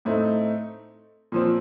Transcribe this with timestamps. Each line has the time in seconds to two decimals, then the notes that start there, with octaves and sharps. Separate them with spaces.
0.05 A2 A3 C4 D#4
1.32 A#2 F3 C4